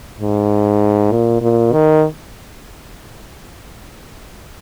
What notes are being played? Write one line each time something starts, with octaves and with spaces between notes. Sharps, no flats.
G#2
A#2
A#2
D#3